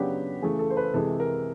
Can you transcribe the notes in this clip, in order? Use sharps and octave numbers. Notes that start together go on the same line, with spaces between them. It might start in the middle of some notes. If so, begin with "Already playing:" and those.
Already playing: C#3 F#3 B3 D4 G4
C#3 E3 A3 G#4
A4
C5
B4
C3 E3 G#3 A4
A#4